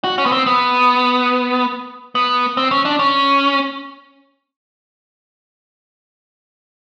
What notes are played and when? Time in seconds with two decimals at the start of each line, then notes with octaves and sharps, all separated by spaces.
0.04 F#4
0.18 C#4
0.26 B3
0.32 C4
0.46 B3
2.15 B3
2.57 C4
2.71 C#4
2.85 D4
2.99 C#4